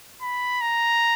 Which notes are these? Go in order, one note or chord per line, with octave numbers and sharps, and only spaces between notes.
B5
A#5